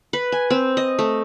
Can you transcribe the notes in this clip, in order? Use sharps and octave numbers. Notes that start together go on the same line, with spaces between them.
B4
G#5
C4
D#5
A3